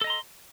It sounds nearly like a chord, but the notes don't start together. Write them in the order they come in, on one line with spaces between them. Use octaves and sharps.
A4 D#5 A#5 C6